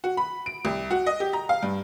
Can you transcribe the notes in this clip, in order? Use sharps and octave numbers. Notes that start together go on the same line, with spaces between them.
F#4
B5
D7
C2
F#4
D#5
G4
A#5
F5
G2